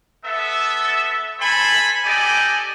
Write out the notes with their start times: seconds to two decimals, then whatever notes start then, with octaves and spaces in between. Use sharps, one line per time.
0.24 B3 A4 E5
1.40 A4 C5 G#5 B5
2.03 G4 A4 D5 D#5 G#5